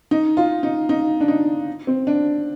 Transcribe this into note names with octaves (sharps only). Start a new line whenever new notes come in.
D#4
F4
D#4
D#4
D4
D#4
C4
D4